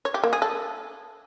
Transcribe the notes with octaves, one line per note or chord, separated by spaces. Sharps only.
C#5
G4
A#3
G#4
A4